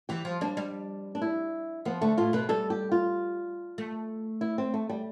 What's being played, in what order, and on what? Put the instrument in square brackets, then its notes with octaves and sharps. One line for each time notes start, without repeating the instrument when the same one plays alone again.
[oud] E3 [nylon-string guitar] G4
[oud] F3
[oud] G3 [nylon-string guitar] D4
[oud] G3
[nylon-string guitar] D4
E4
[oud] F3 [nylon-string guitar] B3
[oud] D3 [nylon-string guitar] A3
[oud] A2 [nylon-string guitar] F4
[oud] B2 [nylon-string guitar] B4
[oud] G3 [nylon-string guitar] A4
[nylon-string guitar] G4
F4
[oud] A3
[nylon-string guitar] E4
C4
A3
G3